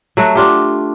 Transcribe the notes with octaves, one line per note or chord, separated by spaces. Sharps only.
F#3 A3 F#4
D4 F4 G4